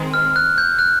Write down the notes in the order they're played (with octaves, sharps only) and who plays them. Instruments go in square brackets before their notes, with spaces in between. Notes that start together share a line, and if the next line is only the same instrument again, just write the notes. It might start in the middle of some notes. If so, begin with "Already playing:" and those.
Already playing: [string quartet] D#3 G#3 C4
[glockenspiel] F6
F#6
G6
F#6